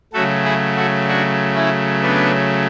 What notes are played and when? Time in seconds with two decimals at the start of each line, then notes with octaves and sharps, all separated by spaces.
0.13 C#3 F#3 A3 F#4 A4
0.45 E4 G#4
0.76 F#4 A4
1.08 D4 F#4
1.55 C#4 E4
2.03 B3 D4